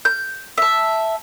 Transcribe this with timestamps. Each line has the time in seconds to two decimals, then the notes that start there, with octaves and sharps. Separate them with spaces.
0.05 G6
0.58 E5 A5